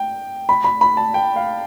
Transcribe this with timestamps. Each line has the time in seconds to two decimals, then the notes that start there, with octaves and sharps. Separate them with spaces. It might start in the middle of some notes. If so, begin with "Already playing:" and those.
Already playing: G5
0.49 B5
0.64 B5
0.81 B5
0.97 A5
1.14 G5
1.36 F5